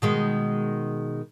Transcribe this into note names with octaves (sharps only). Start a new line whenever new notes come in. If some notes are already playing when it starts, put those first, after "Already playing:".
B2 D#3 G#3